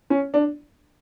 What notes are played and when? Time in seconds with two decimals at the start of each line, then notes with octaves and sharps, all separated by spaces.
0.10 C#4
0.34 D4